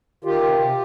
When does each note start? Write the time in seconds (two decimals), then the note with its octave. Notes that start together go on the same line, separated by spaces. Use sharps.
0.24 D#3 F4 G4
0.43 C3
0.59 C3